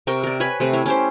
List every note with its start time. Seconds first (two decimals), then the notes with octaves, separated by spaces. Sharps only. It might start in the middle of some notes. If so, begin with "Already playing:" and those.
0.07 C3 A#4 G5 C#6
0.23 A#4 D5
0.40 B4 C#5 G#5 B5
0.60 C3 A3 B4
0.73 E4 C#5
0.86 C#4 G4 C5